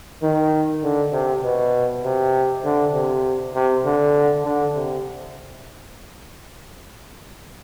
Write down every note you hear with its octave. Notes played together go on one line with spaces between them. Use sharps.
D#3
D3
C3
B2
C3
D3
C3
C3
D3
D3
C3